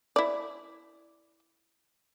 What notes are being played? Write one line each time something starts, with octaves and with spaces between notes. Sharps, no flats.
E4 D5